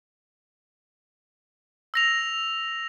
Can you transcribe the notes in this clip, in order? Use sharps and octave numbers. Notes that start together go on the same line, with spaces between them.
E6 A#6 F7